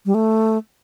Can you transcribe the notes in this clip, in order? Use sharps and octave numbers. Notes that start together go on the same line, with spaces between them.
G3
A3